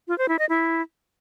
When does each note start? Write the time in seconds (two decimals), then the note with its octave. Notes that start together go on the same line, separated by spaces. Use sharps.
0.08 F4
0.18 C5
0.29 E4
0.39 D#5
0.49 E4